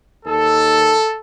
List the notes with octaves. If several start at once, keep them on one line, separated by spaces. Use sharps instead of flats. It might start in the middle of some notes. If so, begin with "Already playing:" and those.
D#2 D#3 A4